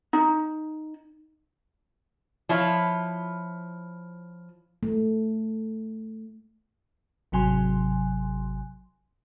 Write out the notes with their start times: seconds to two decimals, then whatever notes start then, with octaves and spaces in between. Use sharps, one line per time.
0.13 D#4
2.49 F3 E4 F4 C#5
4.83 A3
7.32 G#1 C3 F#3 G#5 C6